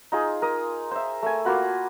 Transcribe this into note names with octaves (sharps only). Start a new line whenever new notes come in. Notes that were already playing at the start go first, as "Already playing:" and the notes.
D#4 F4 G#4
A#4 D#6
C5 E5
A3 G#5
A#3 F4 F#4 B5